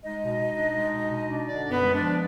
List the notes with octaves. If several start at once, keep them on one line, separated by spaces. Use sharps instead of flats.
G#3 D#4 D#5
B2
B2
D4
G#3
B2
B2
D4
D3 D4 D5
F#2
B3 B4
G#3
D4 D5
F3